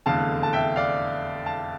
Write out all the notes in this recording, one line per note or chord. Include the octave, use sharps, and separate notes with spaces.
F1 E2 D3 F5 A5
A5
E5 G5
D5 F5
F5 A5